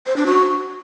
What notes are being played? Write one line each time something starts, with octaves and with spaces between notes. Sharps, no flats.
C5
D4
F#4